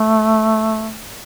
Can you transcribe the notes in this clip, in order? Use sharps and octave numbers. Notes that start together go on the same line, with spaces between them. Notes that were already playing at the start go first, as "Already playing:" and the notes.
Already playing: A3